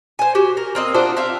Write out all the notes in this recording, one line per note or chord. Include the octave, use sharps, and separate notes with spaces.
C5 G#5
F#4 G4
A#4
A#3 C4 D#5
D4 F4 F#4 C5
C4 E5 F5